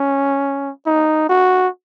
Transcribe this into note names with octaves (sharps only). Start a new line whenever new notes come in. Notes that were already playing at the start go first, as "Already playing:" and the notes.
Already playing: C#4
D#4
F#4